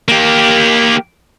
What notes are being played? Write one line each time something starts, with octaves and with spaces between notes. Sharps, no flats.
A#3 G4